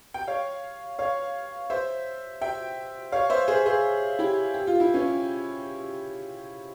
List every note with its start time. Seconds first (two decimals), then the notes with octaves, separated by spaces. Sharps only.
0.14 G5
0.27 C#5 F5
0.99 C#5 F5
1.70 C5 E5
2.41 E5 G5
3.12 C#5 F5
3.30 C5 E5
3.48 G#4 C5
3.65 G#4 C5
4.19 E4 G4
4.54 G4
4.67 F4
4.80 E4
4.94 C#4 F4